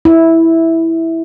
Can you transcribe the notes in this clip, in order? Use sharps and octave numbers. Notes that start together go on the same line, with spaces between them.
E4